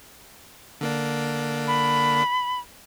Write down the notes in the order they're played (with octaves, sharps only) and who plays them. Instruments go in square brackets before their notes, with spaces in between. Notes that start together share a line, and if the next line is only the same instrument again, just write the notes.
[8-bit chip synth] D3 A#3 D4
[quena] B5